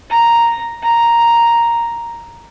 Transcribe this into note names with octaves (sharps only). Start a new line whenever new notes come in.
A#5
A#5